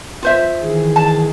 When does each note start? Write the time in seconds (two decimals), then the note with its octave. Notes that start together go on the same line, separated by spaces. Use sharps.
0.23 F4 C5 E5
0.60 D#3 E3 G#4
0.96 A5